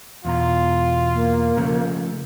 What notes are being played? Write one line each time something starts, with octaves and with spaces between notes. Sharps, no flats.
E2 B2 F4 A#5
A#3
C#3 F3 A3